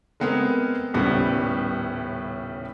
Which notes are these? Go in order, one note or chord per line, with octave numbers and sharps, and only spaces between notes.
G#3 A3 B3 C4 G#4 A#4
D#1 A2 C#3 G3 B3